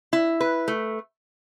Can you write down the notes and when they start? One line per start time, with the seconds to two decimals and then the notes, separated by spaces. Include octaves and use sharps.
0.13 E4
0.40 B4
0.68 A3